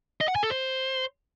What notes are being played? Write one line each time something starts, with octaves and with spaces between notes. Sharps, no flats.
D#5
F#5
G#5
A4
C5